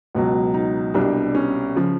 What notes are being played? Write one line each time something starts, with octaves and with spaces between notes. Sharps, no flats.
C#2 B2 F#3
D#4
C2 B2 G3 D4
C#4
C#3 F3